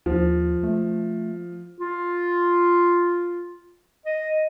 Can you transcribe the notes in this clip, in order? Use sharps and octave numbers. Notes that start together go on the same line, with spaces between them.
D#2 F3
A3
F4
D#5